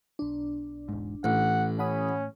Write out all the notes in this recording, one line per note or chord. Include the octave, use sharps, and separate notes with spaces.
B1 D4
E1 G#2
A1 A2 F#5
C#4 F#5 B5 D#6